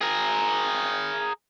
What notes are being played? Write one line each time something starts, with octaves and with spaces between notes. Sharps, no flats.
G#4 A#4